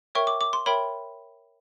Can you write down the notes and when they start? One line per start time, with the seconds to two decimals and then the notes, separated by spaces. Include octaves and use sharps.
0.15 A#4 C#5 E5 G5 C#6
0.27 D6
0.41 D6
0.53 C6
0.66 A#4 C#5 E5 G5 B5